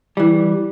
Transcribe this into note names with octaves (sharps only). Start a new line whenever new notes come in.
E3 G3